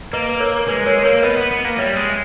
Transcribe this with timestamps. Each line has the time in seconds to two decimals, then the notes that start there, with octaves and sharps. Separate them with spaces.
0.13 A#3 B4 D#5
0.29 B4
0.40 A#4 C#5
0.68 G#3 B4
0.86 G#3 A#4 C#5
1.04 A#3 A#4 C#5
1.23 B3 B4 D#5
1.37 B3
1.51 B3
1.65 A#3
1.78 G3 C#5 E5
1.96 G#3